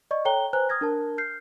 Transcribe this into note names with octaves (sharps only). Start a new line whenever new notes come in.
D5 D#5 C#6
A4 C#5 G5 A#5 F#6 G7
B4 C5 G#5 A#5 F#6
D#6 F6 G#6 A#6
D4 A#4 A5
F6 G6 C7